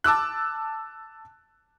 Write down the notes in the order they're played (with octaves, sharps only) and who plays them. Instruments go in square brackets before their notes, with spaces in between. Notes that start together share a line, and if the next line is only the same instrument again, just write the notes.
[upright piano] A5 D6 E6 F#6